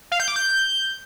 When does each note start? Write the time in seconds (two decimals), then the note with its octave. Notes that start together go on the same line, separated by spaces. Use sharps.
0.12 F5
0.20 G6
0.28 D6
0.36 G6